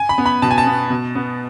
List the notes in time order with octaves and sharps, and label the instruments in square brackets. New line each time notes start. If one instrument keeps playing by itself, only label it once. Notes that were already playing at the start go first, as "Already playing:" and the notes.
Already playing: [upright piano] G#5
B5
B3
B5
B2 A5
G#5
A5
B3
B2
B3